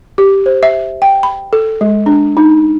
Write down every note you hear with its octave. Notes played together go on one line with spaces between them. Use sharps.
G4
C5
E5
G5
B5
A4
G#3
D4
D#4